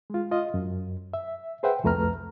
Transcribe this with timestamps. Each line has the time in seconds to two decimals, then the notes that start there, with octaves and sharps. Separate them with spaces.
0.10 G#3 F4
0.31 F4 D#5
0.54 F#2
1.14 E5
1.63 G#4 B4 C5 E5 F#5 G5
1.84 C2 F2 A3 B4 A#5 F6